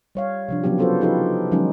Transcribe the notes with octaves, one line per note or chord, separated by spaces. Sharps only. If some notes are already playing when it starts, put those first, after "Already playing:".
G3 C#5 F5
C3 F3 D4
C#3 F#3 B3 G4
B3 F4 F#4 A4 B4 C5
F3 D#4 F4 G4 A4 B4
D#3 F3 F#3 G#3 C#4 D#4